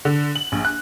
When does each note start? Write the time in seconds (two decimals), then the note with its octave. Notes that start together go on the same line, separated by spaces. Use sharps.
0.05 D3
0.35 F#7
0.52 A#1
0.65 F#6